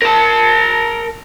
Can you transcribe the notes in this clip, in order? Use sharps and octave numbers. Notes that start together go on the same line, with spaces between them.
A#4 A5